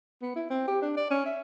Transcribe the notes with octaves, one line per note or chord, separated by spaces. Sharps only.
B3
E4
C4
G4
D4
D5
C#4
E5